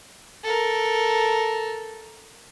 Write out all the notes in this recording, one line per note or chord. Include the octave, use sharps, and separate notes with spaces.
A4 A#4